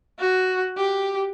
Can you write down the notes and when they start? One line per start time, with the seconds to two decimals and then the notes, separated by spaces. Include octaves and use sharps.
0.20 F#4
0.77 G4